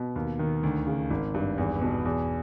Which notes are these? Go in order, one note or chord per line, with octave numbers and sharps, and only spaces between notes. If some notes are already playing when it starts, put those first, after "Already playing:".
Already playing: B2
D#2
D#3
D2
C#3
G#1
G2
E2
B2
E2